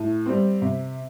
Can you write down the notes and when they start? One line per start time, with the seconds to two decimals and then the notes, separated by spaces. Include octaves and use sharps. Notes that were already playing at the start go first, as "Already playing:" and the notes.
Already playing: A2
0.26 G3 C4
0.62 C3